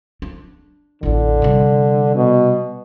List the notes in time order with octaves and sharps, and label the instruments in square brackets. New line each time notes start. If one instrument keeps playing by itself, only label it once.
[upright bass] D4
[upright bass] A1 E2 [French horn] D3
[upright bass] C3 G3
[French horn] B2